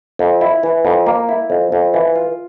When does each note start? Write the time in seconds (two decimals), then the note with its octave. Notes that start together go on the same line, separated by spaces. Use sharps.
0.19 F2
0.41 E4
0.63 E3
0.85 F2
1.06 A#3
1.29 E4
1.50 F2
1.72 F2
1.94 E3
2.16 F4